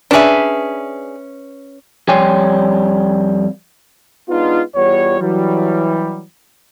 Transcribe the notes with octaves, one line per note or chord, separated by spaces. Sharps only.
C#4 D4 G#4 B4 E5
F2 G3 C#5 G5 G#5 C6
G#3 B3 D4 D#4 F4
E2 G3 B3 F4 C#5
E3 F#3 G3